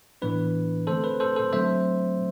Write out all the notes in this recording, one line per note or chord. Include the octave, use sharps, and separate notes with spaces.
A2 E3 B3 D4 B4
D3 A3 C4 A4 C5
B4
A4 C5
A4 C5
D3 F#3 A3 C4 C5 E5